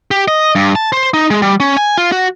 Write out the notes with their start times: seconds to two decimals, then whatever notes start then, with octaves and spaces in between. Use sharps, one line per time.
0.11 G4
0.28 D#5
0.55 G2
0.75 A5
0.92 C5
1.14 D#4
1.31 G#3
1.42 G3
1.60 C#4
1.77 G#5
1.98 F4
2.12 F#4